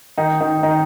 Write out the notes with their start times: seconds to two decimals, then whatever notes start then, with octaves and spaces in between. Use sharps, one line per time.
0.18 D#3 D#4
0.41 D#3 D#4
0.63 D#3 D#4